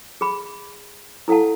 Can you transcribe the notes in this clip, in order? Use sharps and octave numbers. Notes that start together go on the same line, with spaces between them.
G#4 B5
E4 A4 F5 F#5 A5